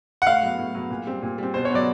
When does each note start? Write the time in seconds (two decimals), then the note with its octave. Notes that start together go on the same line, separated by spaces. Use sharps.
0.22 F#5
0.26 A2 F5
0.43 F#3 B3
0.58 A2
0.75 F#3 B3
0.90 A#2
1.07 G3 C4
1.22 A#2
1.38 G3 C4
1.54 B2 C5
1.65 C#5
1.70 F#3 B3 D5